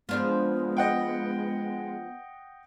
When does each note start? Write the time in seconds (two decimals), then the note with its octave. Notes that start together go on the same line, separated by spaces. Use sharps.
0.09 F3 G#3 B3 D4 F4
0.77 D#5 F#5 G5